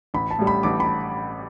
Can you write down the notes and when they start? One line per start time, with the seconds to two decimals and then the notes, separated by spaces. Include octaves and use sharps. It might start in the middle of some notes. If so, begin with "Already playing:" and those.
0.14 A1 B5
0.31 A5
0.39 A2 G3
0.47 B5
0.63 A1 D6
0.80 B5